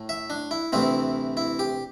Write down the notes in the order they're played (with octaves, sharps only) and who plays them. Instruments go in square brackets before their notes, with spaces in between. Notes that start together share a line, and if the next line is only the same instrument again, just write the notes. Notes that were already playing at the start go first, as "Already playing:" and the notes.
Already playing: [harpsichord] A2 A3
E5
D4
E4
D2 C3 E3 C4 E4
E4
G4